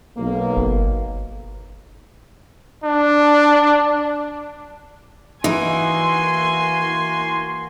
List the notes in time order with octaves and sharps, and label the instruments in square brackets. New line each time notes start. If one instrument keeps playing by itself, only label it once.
[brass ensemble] B1 A#3
[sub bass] G1
[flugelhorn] D4
[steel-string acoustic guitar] E3 [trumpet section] A#3 F#4 C6 [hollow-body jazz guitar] D#4 E4 [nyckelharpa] G#5